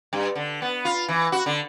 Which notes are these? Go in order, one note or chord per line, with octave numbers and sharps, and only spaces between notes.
G2
D3
B3
F4
E3
F#4
D3